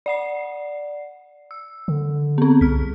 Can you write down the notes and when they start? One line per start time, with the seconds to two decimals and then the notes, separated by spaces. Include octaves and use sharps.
0.06 D5 F#5 C7
1.51 E6
1.88 D3
2.38 B3 C4
2.61 C2 F6 B6